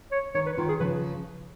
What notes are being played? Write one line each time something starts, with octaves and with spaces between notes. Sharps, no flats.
C#5
D#3 C#5
B4
D#3 F4
G#4
C#3 F3 B4